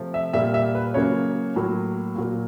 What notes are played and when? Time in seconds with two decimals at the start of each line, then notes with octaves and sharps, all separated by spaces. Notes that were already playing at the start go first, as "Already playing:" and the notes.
Already playing: C3 F3 A3
0.14 E5
0.33 A#2 G3 A#3 E5
0.54 E5
0.75 B4
0.94 C#3 F#3 A#3 C#5
1.56 A2 F#3 A#3
2.16 A#2 F#3 A#3